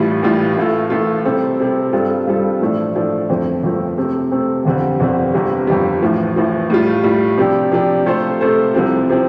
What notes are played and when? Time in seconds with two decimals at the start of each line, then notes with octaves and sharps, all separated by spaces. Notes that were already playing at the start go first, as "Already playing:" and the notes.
Already playing: A1 A2 G3 F4
0.23 A1 A2 G3 F4
0.57 A1 A2 A3 F4
0.90 A1 A2 A3 F4
1.25 C3 G3 C4 A4
1.59 C3 G3 C4 A4
1.93 G2 G3 C4 F4 A4
2.27 G2 G3 C4 F4 A4
2.61 A1 A2 F3 A3 D4
2.95 A1 A2 F3 A3 D4
3.29 G1 F2 F3 A3 C4
3.63 G1 F2 F3 A3 C4
3.98 C3 A3 C4
4.31 C3 A3 C4
4.65 G1 F2 D3 G3 C4
5.00 G1 F2 D3 G3 C4
5.34 G1 F2 C3 G3
5.67 G1 F2 C3 G3
6.02 A1 A2 F3
6.36 A1 A2 F3
6.70 A2 G3 F4
7.03 A2 G3 F4
7.38 C3 F3 D4 G4
7.72 C3 F3 D4 G4
8.06 C3 A3 F4 A4 C5
8.41 C3 A3 F4 A4 C5
8.75 C2 C3 F3 C4
9.10 C3 F3 C4